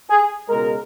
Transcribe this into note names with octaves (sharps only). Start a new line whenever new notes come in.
G#4
C#2 B2 G#3 A#4